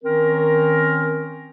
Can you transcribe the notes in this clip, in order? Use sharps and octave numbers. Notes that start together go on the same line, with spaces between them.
D#3 C4 C#4 A#4